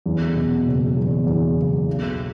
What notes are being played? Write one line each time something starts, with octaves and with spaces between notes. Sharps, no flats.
E2
B2
F#1
E2
E2
F#1
B1